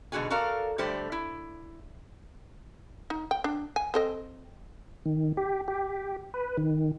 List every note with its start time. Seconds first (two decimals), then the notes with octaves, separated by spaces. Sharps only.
0.12 G#2 B2 D3 F#4 G#4 G#5
0.30 F#4 A4 A#4 D5 F5
0.78 D3 G3 A3 G4 C5 D5
1.12 E4
3.10 D#4
3.31 G5
3.44 D4
3.76 G#5
3.94 C4 A4 D#5
5.05 D#3
5.37 G4
5.68 G4
6.34 B4
6.57 D#3